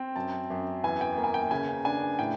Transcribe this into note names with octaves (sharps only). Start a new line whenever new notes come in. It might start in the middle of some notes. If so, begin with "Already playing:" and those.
Already playing: C4
F#2 A5
F#2
E2 G#5
G5
A#3
G#5
G5
C#3 G#5
D4 G#5
A2 G5